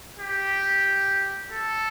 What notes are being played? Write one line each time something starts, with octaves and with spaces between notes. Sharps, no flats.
G4
A4